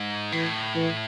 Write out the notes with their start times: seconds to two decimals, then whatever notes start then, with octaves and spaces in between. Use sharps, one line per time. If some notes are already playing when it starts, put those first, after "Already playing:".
Already playing: G#2
0.32 A2 E3
0.75 E3